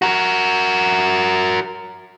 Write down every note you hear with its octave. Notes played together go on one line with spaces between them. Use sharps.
F#4 A#4